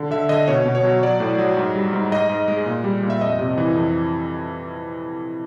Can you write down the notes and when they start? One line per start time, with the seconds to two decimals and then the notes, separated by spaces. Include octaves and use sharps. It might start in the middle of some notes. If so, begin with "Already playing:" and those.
Already playing: D3
0.11 D3 E5
0.29 D3 D#5
0.48 B2 C#5
0.66 B2
0.75 C#5
0.84 F#3
1.03 F#3 D5
1.20 A2
1.38 F#3
1.57 G#2
1.75 G3
1.93 G#2
2.12 G#2 D#5
2.29 G#2
2.48 G#3
2.66 A#2
2.84 G3
3.03 A#2
3.10 E5
3.21 F2 D#5
3.39 C3
3.58 E3
3.75 F2